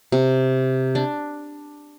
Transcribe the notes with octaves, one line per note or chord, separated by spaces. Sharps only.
C3
D4